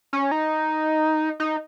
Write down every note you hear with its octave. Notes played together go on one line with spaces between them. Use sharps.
C#4
D#4
D#4